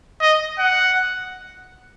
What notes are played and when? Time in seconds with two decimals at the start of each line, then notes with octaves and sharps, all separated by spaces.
0.21 D#5
0.59 F#5